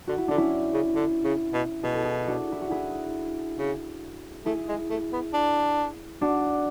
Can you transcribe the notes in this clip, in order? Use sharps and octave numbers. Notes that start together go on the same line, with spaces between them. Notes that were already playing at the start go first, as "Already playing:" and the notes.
D3 F#4
E4
D3 D4
C#4 E4
C#3
D3
C#3
B2
B2 G#4
A4
E4 G#4
D4 F#4
E4
F#4
E4 G#4
C#3
A3 E4 G#4
G#3
A3
B3
D4
D4 F#4